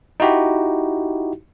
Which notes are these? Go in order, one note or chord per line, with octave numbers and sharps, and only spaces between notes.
D#4 E4 F#4 G4